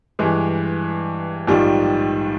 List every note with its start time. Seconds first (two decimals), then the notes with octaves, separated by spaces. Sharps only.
0.19 G2 E3 G#3
1.47 A#1 G#2 D#3 G3